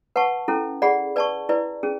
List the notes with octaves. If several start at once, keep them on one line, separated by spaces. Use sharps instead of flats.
B4 F#5 A5 C#6
C#4 E4 A4
G#4 D5 F#5 B5
B4 D5 A5 C#6
E4 B4 D5
C#4 G#4